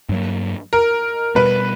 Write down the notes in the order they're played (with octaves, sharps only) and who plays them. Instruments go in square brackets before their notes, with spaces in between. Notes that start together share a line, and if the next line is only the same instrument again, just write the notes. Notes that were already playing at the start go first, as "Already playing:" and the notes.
[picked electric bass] G2 F#3 A#3
[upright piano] A#4
[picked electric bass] B2 G3 B3 [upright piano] B4